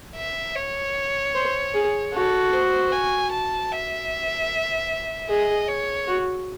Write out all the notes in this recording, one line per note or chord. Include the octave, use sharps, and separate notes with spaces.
E5
C#5
C5
G#4
F#4 A4
C5
G#5
A5
E5
G#4 D#5
C#5
F#4